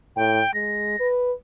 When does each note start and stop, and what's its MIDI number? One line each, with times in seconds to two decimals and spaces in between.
0.16 0.41 45
0.16 0.54 79
0.54 0.96 56
0.54 1.07 94
1.00 1.33 71